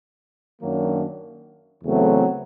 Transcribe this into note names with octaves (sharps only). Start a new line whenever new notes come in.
F#2 D#3 F#3 A#3 D4
E2 C#3 F#3 A3 C4